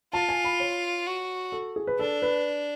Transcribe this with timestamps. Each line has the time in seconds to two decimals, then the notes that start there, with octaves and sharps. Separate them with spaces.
0.13 F4 A5
0.29 G#5
0.45 B5
0.60 C#5
1.07 F#4
1.52 A4
1.76 G#4
1.87 B4
1.99 D4 A4
2.22 B4